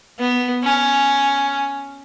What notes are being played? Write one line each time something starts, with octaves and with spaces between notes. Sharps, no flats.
B3
C#4